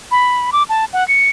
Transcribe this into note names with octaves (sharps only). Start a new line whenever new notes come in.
B5
D6
A5
F#5
C#7